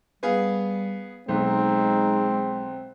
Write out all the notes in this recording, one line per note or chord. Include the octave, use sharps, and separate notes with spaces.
G3 B3 G#4 F5
B1 G#3 C4 D#4